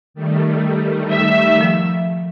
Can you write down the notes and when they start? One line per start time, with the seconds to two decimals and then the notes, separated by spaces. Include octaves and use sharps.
0.14 D#3 G3 A3
1.10 E5
1.61 F3